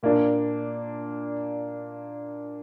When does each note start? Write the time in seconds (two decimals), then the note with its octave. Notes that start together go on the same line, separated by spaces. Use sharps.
0.03 A#2 A#3 D4